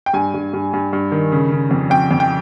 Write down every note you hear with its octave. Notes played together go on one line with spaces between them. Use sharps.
G5
G2 G#5
G2
G2
G2
G2
D#3
C#3
C#3
F2
F2 G5
F2
G5